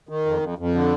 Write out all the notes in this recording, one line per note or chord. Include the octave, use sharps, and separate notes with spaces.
D#3
F2
F2
F2
D3